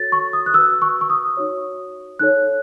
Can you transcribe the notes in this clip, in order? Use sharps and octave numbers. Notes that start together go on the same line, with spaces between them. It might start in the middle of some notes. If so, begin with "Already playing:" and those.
Already playing: F#4 A4 C#5 A6
C#6
D#6
F#6
F#4 B4 E6
C#6
C#6
D#6
D#4 F#4 C#5
D#4 A4 C#5 F#6